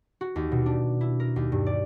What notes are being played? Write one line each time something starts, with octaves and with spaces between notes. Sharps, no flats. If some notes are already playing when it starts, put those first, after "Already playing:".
F#4
D#2
B2
D4
E4
A#4
D#2
G2
D5